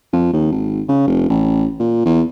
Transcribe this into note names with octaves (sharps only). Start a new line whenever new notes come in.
F2
D#2
G#1
C#3
F1
A1
A#2
E2